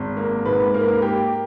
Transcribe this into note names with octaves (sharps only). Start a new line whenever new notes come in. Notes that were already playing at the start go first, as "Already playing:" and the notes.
Already playing: G#1
A#3
G#2 B4
A#3 A#4
B4
A#4
A#3 G4